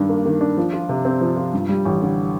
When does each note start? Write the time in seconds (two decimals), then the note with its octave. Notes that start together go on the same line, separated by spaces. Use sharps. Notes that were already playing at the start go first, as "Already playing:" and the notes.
Already playing: G2 D#3 D4
0.09 A#3
0.26 D#3
0.41 D4
0.57 F3
0.73 F4
0.89 C3
1.05 C4
1.21 F3
1.37 F4
1.53 G2
1.69 G3
1.85 A1
2.02 D3